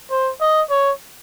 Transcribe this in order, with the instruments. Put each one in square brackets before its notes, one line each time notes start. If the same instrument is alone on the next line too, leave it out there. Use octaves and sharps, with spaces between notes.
[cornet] C5
D#5
C#5